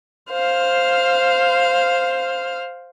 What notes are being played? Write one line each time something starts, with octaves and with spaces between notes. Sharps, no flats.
C5 F5 F6